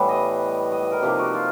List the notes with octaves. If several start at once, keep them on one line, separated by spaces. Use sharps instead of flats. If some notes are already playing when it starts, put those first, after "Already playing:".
Already playing: A2 E3 G3 B3 B4
D#5
D#5
D#5
A#4
C3 F3 A#3 D#4 G4
F#4
F4